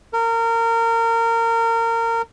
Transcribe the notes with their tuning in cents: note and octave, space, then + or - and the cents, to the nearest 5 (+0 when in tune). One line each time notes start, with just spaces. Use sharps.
A#4 -25